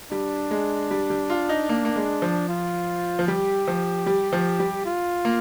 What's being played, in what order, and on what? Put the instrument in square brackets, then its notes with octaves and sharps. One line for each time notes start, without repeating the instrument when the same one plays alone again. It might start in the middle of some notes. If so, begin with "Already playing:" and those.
[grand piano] G3 [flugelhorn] D4
[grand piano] G#3
G3
G3
F4
D#4
A#3
A#3
G#3
F3
[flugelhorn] F4
[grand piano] F3
[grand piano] G3 [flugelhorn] G4
[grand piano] F3
G3
F3
G3
[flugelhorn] F4
[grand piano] A#3